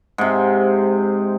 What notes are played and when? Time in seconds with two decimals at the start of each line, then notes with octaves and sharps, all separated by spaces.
0.18 G#2 C3